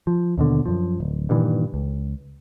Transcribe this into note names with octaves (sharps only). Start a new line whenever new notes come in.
F3
D#2 B2 D3
F#2 F3
D1
G2 A#2 D#3 E3
C#2